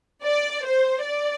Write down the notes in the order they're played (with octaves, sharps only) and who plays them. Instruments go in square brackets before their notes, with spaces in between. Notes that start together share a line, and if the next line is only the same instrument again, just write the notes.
[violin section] D5
C5
D5